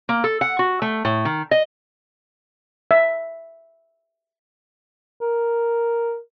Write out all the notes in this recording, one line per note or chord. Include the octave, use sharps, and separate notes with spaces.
A#3
A4
F#5
F#4
A3
A2
D#3
D#5
E5
A#4